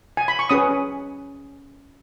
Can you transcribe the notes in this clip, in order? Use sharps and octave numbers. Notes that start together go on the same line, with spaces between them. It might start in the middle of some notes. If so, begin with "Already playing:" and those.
G#5
B5
C#6
C#4 G#4 B4 D#6